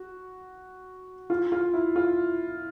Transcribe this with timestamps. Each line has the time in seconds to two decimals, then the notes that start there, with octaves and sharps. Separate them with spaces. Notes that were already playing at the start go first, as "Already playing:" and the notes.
Already playing: F#4
1.30 F4
1.52 F4
1.74 E4
1.96 F4